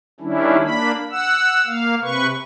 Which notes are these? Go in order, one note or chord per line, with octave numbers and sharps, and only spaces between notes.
D#3 G3 C#4 D4 E4
A#3 D4 B5
F#5 E6
A#3 F5
C3 B4 C#6